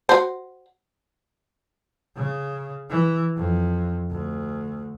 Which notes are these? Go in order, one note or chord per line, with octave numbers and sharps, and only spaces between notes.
F#4 C5
C#3
E3
F2
D2